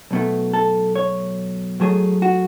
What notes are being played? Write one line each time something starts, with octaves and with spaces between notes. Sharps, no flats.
B1 B2 A3
A4
C#5
G#2 F#3 A3 G#4
F#4